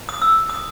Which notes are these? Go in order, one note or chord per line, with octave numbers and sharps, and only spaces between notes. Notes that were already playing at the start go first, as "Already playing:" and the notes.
D#6
E6
D#6